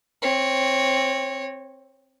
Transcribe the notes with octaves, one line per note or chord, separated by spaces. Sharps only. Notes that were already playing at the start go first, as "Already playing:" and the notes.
C4 C#5